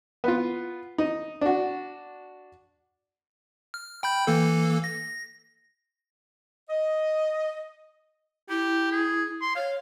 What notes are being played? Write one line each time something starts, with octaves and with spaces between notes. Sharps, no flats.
B3 F4
D#4
D4 F#4
F6
G5 B5 G6
E3 A#3 A4
A#6
D#5
E4 G4
G#4
C6
C#5 F5